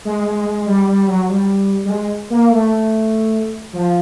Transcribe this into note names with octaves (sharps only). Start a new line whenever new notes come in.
G#3
G#3
G#3
G3
G3
F#3
G3
G3
G#3
A#3
A3
F3